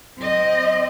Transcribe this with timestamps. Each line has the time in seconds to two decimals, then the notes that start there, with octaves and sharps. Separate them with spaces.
0.19 C4 D#5